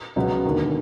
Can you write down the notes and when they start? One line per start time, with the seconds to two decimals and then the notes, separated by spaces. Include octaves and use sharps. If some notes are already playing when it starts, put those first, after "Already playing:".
0.16 C#2 B2 F#3 B3
0.45 E1 D#2 D3